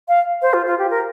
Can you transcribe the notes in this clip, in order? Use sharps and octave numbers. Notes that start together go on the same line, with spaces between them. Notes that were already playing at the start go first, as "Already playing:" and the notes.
F5
C5
F4
F4
G4
A#4